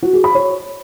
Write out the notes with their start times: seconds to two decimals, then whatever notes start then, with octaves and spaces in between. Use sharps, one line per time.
0.03 F#4
0.13 G#4
0.24 B5
0.35 C#5